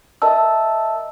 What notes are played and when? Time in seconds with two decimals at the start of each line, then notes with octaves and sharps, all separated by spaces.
0.22 A#4 D#5 E5 A5 E6